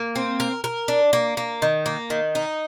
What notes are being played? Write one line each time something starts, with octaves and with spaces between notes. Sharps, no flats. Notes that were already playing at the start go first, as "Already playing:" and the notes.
Already playing: A#3
C4
A#4
A#4
D4
A#3
A#3
D#3
A#3
D#3
D#4